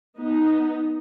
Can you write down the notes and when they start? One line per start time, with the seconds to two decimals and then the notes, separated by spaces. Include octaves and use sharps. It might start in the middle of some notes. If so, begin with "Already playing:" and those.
0.17 B3 D#4